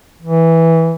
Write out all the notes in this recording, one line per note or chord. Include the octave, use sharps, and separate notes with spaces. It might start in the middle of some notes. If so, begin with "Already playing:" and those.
E3